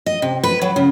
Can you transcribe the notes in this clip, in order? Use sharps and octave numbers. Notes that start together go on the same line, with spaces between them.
D#5
C3
B4
F#3
C#3